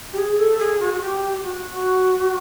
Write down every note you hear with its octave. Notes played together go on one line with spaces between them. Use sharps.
G4
G#4
A4
G#4
F#4
F#4
G4
G4
F#4